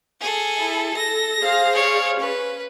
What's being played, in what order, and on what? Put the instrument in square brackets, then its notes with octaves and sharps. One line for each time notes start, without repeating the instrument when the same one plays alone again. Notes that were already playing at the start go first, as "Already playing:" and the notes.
[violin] G#4 A4
[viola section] E4
[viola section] A4 [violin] A#6
[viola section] G#4 C5 F5
[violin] C#5 D5
[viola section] C#4 [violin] B4